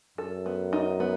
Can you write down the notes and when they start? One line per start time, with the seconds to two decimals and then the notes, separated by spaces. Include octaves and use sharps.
0.18 F#2 A4
0.46 B3
0.73 D#4
1.00 B3